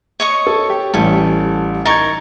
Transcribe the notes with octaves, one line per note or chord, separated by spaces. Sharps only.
C#5 D#5 C#6
A4
G4
A1 G3 A4 G#5
D#4 A#4 C#6 G#6 A6